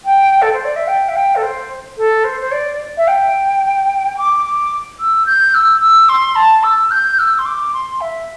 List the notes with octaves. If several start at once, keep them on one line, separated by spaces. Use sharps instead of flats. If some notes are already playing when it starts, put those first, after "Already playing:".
G5
A4
C5
D5
E5
G5
E5
G5
A4
C5
A4
C5
C5
D5
E5
G5
D6
D6
E6
G6
E6
E6
C6
A5
E6
G6
E6
C6
D6
C6
E5